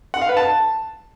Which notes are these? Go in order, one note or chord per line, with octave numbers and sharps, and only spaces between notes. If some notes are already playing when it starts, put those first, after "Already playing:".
F#5
F5
B4
A5